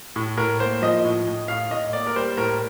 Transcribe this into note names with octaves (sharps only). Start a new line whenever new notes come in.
A2
A2 A#4
A#3 C5
F3 D#5
A2
A2
A2 F5
A2 D#5
A#3 D5
A#4
G3 C5
A2 A#4